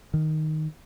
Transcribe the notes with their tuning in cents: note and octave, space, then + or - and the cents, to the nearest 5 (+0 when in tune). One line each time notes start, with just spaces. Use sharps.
D#3 +0